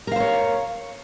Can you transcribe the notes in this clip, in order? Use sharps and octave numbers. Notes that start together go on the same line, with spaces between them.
A#4 C5 C#5 F5